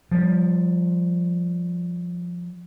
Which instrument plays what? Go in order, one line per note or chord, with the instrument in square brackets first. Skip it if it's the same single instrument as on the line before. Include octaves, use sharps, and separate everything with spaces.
[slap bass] F3 G3